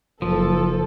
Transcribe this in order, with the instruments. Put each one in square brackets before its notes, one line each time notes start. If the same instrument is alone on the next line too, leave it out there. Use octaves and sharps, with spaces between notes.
[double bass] F#1 [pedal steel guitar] F3 [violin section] A4